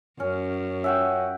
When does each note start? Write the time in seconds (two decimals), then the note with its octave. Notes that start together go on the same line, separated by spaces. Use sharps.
0.20 F#2 C#4
0.84 C#4 E5 F#5 G5